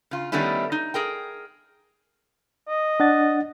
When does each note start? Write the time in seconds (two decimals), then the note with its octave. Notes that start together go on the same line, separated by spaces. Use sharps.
0.11 C#3 F4
0.32 D#3 G3 A3 B3 C#4 E4
0.72 D#4
0.94 G#4 A#4 G5
2.68 D#5
3.00 D4 F#5 A6